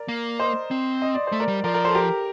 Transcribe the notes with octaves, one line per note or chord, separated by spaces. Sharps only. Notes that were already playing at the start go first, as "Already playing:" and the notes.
Already playing: A#4 D5
A#3
C5 D#5
C4
D#5
D5
C5
A3
A#4 D5
G3
F3 A#4 D5
A#4 D5
A4 C5
G4 A#4